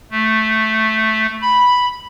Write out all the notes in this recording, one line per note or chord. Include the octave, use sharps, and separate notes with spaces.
A3
B5